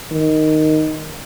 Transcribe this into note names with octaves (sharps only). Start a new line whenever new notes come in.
D#3